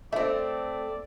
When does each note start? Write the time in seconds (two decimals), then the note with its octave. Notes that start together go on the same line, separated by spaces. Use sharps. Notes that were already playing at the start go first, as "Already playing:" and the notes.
0.12 A3 C4 D5 E5